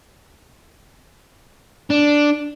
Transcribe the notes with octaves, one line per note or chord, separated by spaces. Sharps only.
D4